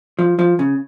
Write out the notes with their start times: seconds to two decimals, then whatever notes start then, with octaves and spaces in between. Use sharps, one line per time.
0.19 F3
0.39 F3
0.59 C#3